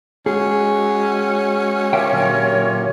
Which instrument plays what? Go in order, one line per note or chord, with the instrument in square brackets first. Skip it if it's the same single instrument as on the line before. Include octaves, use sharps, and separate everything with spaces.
[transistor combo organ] G#3 F#4 [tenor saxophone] C#4 [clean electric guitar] G#4
[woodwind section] F4 A#4 C#5 [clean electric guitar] G4 E5 G5
[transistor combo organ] A#2 D3 F#3